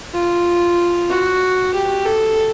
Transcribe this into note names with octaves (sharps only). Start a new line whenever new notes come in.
F4
F#4
G4
A4